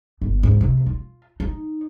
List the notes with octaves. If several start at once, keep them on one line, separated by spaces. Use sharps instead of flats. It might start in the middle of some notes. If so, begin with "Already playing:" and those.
G1
G#2
C3
F4
D#4